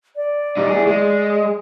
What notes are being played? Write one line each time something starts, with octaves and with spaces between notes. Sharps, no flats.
D5
G3 D#4
E4 G#4
G#3